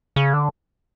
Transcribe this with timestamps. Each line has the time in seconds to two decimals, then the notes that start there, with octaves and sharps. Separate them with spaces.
0.16 C#3
0.33 D3